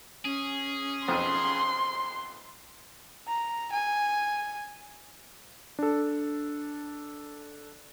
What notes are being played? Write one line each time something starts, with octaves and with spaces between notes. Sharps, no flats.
C#4 G#4
B1 F2 C6
A#5
G#5
D4 A4